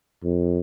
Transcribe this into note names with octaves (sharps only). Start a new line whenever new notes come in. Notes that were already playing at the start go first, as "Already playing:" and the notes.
F2